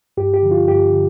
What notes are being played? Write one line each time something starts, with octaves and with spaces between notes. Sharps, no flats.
G2 G4
G4
D3 F3
F4
G2 G4
D3